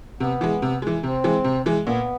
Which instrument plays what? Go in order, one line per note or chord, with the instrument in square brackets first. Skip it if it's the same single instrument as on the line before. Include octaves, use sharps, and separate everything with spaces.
[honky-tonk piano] C3 [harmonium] B3
[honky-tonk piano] E3 G#3
C3
E3 G#3
[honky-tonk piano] C3 [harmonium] C4
[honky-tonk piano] E3 G#3
C3
E3 G#3
[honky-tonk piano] A#2 [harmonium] B3